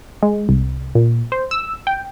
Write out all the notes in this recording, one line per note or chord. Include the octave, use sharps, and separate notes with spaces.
G#3
C2
A#2
C5
E6
G5